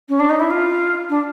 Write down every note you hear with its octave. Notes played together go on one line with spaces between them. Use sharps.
C#4
D4
D#4
E4
F4
D4